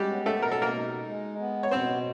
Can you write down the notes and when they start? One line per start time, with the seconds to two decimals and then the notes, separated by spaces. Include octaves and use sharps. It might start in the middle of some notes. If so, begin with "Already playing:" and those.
Already playing: G3 G#3 F#4 G4
0.10 B3
0.26 A3 A4
0.42 B2 A#4
0.52 A4
0.62 A#3 A#4
0.75 D#4
1.07 G#3
1.39 B3
1.63 C#5
1.71 B2 C4 C5